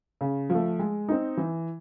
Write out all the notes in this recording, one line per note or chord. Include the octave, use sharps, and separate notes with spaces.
C#3
F3 A3
G#3
C4 D#4
E3